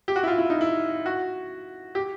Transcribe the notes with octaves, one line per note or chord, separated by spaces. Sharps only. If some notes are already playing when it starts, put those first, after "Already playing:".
G4
F#4
E4
F4
E4
D#4
E4
F#4
G4